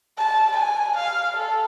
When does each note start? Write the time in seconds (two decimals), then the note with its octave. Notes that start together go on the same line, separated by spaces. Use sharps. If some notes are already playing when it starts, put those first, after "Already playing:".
0.18 A5
0.57 G#5
0.97 F5
1.36 A4